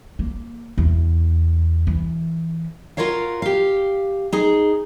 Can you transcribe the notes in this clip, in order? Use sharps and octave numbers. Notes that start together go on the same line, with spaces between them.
A#3
E2
E3
F4 F#4 A#4 C#5 F5
G4 F5
D#4 G#4